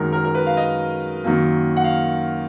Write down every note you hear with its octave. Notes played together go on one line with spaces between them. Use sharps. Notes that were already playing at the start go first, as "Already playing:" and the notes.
Already playing: F#2 D#3 G#3 A#4
A#4
A#4
B4
F5
D#5
F#2 D#3 F#3 A#3
F#5
F5